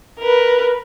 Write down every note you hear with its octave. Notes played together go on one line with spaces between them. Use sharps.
A#4 B4